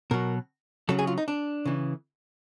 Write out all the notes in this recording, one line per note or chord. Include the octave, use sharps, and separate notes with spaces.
B2 F#3 A#4
C#3 F#3 A4
G#4
F4
D#4
D4
C#3 E3